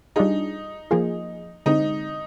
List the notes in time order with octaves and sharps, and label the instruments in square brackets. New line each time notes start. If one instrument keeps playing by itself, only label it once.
[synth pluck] G3 D4 F4 G#4 [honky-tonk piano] D#4
[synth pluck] F3 A#3 F4 G#4
[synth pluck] D3 G#3 C4 [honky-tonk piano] D#4